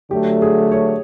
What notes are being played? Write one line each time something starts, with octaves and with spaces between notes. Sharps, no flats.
D3 F#3 A3 G4
G#4
C#5